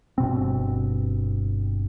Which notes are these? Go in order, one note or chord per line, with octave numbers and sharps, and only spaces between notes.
G1 B2 C4